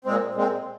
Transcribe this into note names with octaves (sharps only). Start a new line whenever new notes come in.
A#2 G#3 C4
A#2 G#3 C4